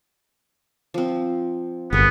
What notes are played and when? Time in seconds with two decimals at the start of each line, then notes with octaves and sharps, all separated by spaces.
0.94 F3 C4
1.93 G1 B3 G#4 A#4 C#5